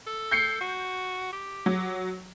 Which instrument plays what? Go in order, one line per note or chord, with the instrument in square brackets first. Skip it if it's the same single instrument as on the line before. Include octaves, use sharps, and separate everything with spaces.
[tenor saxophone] A4
[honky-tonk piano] G6 C7 C#7
[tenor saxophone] F#4
G4
[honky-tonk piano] F#3